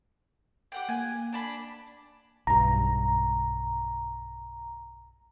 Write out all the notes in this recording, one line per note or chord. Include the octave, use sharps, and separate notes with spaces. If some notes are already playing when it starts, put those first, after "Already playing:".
G4 F#5 G5
A#3 G#5
D4 A5 B5
B1 G2 A#5